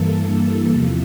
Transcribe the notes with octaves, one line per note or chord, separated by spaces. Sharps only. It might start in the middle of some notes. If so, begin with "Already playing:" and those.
Already playing: G2 E3 A#3 A4
E2 C3 F3